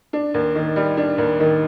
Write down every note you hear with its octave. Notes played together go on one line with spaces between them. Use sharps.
D4
D#2
D#3
G3
D4
D#2
D#3